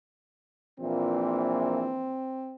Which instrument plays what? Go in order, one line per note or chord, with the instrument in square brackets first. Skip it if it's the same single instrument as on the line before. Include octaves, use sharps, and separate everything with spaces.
[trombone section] A#1 A#2 E3 [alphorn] C4